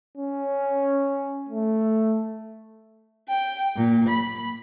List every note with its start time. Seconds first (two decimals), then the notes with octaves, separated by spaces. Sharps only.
0.17 C#4
1.49 A3
3.28 G5
3.76 A#2
4.10 B5